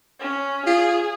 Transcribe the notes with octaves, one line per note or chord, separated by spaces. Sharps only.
C#4
F4 G#4